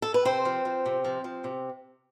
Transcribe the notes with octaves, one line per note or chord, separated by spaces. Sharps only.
A4
B4
C3 C4 C5
F3
F3
C3
F3
F3
C3